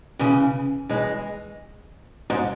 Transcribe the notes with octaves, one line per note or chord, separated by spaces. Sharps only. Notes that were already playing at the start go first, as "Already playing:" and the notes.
C#3 E3
E3 G#3
G#2